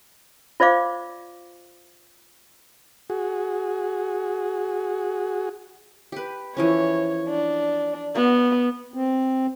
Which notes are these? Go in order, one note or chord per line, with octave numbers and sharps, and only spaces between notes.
F4 C5 D5 F5 D6
F#4 G#4
G4 B4
E3 F3 C#4 C#5
D4
B3 F#4
C4